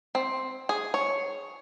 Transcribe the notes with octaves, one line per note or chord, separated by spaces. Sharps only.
C4
G#4
C#5